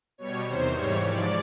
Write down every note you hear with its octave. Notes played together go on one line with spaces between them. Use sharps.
B2 G3 C#5
E2 C3 D#3 C5
G#2 E3 G3 C#5
G#2 F3 D5